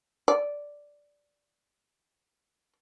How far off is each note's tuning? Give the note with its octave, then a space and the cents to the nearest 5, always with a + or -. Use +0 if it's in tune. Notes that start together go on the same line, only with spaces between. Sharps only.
D5 -5